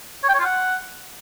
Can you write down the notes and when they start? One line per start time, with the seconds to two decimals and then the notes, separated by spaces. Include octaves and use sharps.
0.23 C#5
0.29 G5
0.34 C#5
0.39 F4
0.45 F#5